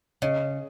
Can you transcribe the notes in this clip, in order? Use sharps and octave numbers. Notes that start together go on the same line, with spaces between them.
C#3 D#5